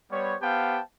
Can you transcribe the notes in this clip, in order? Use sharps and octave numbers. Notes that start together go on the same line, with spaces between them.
G3 B3 C5 C#5
B3 G4 C5 F5 G5 A5